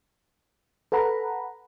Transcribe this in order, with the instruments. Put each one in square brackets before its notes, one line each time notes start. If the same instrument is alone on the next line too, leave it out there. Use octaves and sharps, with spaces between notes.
[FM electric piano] A4 B4 F#5 A#5 B5